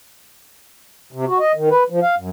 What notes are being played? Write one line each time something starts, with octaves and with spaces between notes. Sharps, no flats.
C3
F#4
D#5
D#3
B4
F3
F5
F#2